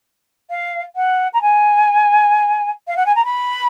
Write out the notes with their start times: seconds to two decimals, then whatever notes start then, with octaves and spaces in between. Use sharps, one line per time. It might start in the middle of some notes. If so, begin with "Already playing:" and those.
0.50 F5
0.96 F#5
1.33 A#5
1.42 G#5
2.87 F5
2.96 F#5
3.06 G#5
3.15 A#5
3.25 B5